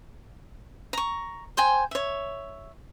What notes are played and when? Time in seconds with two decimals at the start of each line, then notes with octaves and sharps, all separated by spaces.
0.93 A#5 C#6
1.57 C5 G5 G#5
1.91 C#5 E5